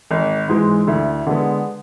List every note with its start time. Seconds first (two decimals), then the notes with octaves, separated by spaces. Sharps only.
0.11 G#1
0.48 G#2 E3 G#3
0.87 D2 E4
1.26 D3 G#3 B3